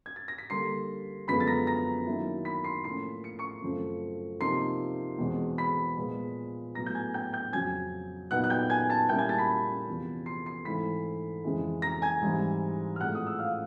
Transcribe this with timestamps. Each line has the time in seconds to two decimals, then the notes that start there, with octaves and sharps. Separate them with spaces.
0.06 G#6
0.16 A6
0.28 A#6
0.38 B6
0.50 D3 G3 A#3 C6 C7
1.28 F#2 D3 F3 G#3 B3 B5 B6
1.40 A6
1.47 A#5 A#6
1.67 A#5 A#6
2.07 D#3 F#3 A#3 C#4 E4
2.45 B5 B6
2.64 C6 C7
2.84 A2 F3 A#3 C#4 C6 C7
3.24 C#7
3.39 C#6 C#7
3.62 F#2 C#3 F3 A3 C4
4.40 C3 F3 A#3 D#4 C6 C7
5.18 E2 B2 G#3 C4
5.58 B5 B6
5.97 A#2 F3 G#3 B3
6.75 A2 F#3 B3 A#5 A#6
6.86 G6
6.95 G#5 G#6
7.14 G5 G6
7.33 G5 G6
7.53 F2 C#3 F#3 G#5 G#6
8.31 A#2 F#3 B3 D#4 F#5 F#6
8.44 F#6
8.50 G5 G6
8.70 G#5 G#6
8.90 A5 A6
9.09 A#2 G3 A#3 C#4 E4 G5 G6
9.19 G#5 G#6
9.29 A5 A6
9.38 B5 B6
9.87 E2 C3 F3
10.26 C6 C7
10.46 C6 C7
10.65 G#2 E3 A3 C4 E4 B5 B6
11.44 F2 C#3 E3 G#3
11.82 A#5 A#6
12.02 G#5 G#6
12.21 G#2 E3 G3 C4 E4
12.96 F6
13.00 A2 F3 G#3 C4 F#5 F#6
13.15 D#6
13.27 E6
13.39 F5 F6